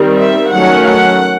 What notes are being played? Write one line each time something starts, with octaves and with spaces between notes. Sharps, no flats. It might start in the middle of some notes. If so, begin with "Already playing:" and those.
Already playing: D#3 G3 C4
E5
D#3 F#3 A3 C#4 F#5
F#5